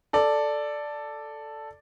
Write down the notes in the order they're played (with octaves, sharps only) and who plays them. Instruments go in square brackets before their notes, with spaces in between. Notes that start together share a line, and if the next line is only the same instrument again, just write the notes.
[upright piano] A4 D5